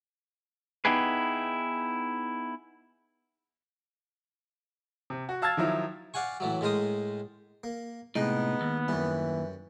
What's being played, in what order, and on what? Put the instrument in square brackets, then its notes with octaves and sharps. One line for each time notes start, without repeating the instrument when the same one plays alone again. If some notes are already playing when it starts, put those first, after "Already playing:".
[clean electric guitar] B3 D#4 E4 G4 G#4 B4
[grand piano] C3
F#4
F5 A5 E6 F6 G#6 A6
D#3 F3 F#3 E4
[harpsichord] D5 F5 F#5 G#5 C#6
A2 E3 F#3
A2 G#3 A#4 C5 D#6
A#3
[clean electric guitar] A2 C3 [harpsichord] G#3 G4 [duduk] B3 [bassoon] D#4
[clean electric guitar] D#2
[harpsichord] F#2 G3 [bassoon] E3